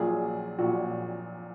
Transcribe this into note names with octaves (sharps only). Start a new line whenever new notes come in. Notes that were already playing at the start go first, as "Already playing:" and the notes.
Already playing: A#1 A#2 F#3 G#4
A#1 A#2 F#3 F#4